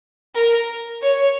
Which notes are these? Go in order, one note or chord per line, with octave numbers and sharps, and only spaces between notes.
A#4
C#5